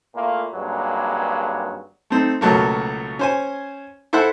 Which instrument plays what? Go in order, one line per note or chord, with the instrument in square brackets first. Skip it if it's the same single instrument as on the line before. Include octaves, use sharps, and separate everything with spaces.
[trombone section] A#2 A3 A#3 E4 F4
G#1 G2 F#3 G#3 A#3
[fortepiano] A3 C4 D#4
C#2 B2 F#3 A3 A#3
C#4 C5 G#5
E4 A4 C5 E5 F#5